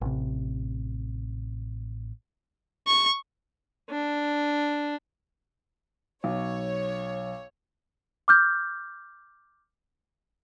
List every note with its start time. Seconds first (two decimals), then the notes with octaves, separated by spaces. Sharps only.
0.01 A1 C3
2.87 C#6
3.90 D4
6.24 B1 C#5
8.28 D6 F6 G6